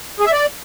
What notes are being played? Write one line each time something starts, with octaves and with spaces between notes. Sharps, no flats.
G#4
E5
D5